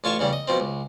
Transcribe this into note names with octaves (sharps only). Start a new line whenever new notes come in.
A1 F4 C#5 A5 C#6
E2 C#3 G3
D#5
B2 F3 C4
C#2